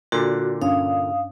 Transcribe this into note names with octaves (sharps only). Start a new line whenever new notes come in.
A#2 D3 F#4
G2 C#4 D4 F5 D#6